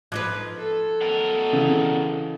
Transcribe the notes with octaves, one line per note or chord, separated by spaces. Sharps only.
F3 D#4 B4 D6 F#6 G#6
A4
B2 A#4
C#3 E3